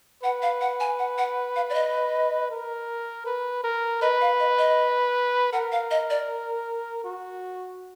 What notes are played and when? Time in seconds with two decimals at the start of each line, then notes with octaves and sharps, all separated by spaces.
0.23 B4 F#5
0.42 F5
0.61 F#5
0.80 G#5
0.99 F#5
1.18 F#5
1.56 F5
1.70 D5
1.74 D#5
2.51 A#4
3.26 B4
3.64 A#4
4.01 B4 D#5
4.21 F5
4.39 D#5
4.58 D#5
5.53 A#4 F#5
5.72 F5
5.91 D#5
6.10 D5
7.05 F#4